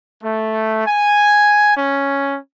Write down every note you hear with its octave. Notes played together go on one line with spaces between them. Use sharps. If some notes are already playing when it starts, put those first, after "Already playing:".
A3
G#5
C#4